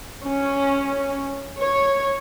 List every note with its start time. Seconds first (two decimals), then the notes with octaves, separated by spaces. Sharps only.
0.23 C#4
1.60 C#5